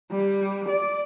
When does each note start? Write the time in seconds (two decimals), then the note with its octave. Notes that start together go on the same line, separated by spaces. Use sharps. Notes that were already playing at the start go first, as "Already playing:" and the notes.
0.11 G3
0.69 D5